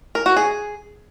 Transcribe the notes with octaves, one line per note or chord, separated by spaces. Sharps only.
A#4
F#4
G#4